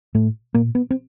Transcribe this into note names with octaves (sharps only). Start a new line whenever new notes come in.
A2 A3
A#2 A#3
B3
C4